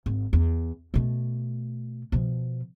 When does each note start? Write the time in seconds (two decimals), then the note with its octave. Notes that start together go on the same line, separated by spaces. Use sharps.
0.06 G#1
0.33 E2
0.94 B2 A3
2.12 B2 F3